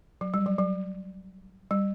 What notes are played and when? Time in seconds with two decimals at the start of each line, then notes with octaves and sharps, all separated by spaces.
0.21 F#3
0.34 G3
0.46 F#3
0.59 F#3
1.71 G3